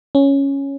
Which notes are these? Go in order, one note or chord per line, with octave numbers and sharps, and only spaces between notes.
C#4